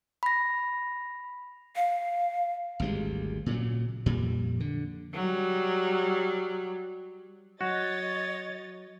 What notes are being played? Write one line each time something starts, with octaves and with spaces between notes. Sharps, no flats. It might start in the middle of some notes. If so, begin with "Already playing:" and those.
B5 A#6
F5
G#1 D2 G3 G#3
A#2 C#3 F#3
F2 A#2 G3
D3
F#3 G3
F#3 F#4 C#5 D#5 A6